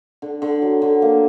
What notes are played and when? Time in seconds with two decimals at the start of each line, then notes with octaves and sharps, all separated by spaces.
0.22 D3
0.42 D3
0.62 F#3
0.82 D3
1.02 A#3